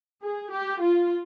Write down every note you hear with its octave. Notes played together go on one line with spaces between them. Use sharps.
G#4
G4
F4